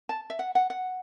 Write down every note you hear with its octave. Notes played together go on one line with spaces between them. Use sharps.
A5
E5
F#5
F#5
F#5